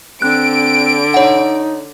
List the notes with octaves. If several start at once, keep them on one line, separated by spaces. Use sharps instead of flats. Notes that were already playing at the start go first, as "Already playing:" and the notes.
D3 C4 F#6 D7
D#4 C#5 F#5